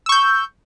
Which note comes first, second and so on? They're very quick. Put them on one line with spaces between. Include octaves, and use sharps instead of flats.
E6 C#6 G6